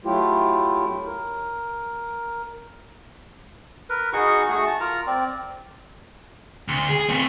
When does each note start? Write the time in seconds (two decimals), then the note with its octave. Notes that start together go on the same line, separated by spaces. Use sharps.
0.05 F#3 A3 E4 F4 G4
1.06 A#4
3.89 A#4 B4
4.13 D#4 F#4 G#4 C#6
4.49 A3 F#4 G#4 C#6
4.66 A5
4.80 F4 A#4 A#5
5.07 C4 D5
6.68 D2
6.89 G#4
7.09 A3 C4